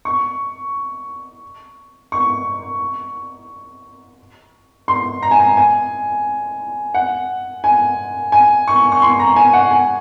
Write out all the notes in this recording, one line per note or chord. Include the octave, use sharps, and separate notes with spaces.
C#6
C#6
C6
A#5
G#5
A#5
G#5
F#5
G#5
G#5
C#6
C#6
C6
A#5
G#5
F#5
G#5